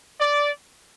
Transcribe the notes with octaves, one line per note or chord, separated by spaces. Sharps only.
D5